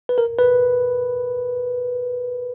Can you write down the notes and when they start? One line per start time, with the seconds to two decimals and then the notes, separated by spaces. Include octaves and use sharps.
0.09 B4
0.18 A#4
0.39 B4